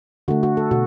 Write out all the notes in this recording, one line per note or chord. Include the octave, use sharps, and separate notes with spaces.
D3 A3 F#4
F#4
A4
B2 F#4